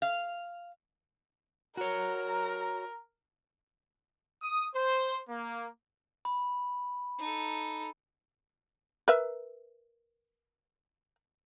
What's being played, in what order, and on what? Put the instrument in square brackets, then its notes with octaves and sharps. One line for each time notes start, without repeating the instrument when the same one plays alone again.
[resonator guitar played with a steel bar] F5
[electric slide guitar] F#4 C#5 [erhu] A#4 [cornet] A#5
[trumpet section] D#6
C5
A#3
[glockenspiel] B5
[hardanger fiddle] D#4 A4
[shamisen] A#4 B4 E5